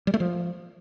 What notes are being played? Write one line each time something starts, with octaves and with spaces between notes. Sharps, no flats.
G3
A3
F3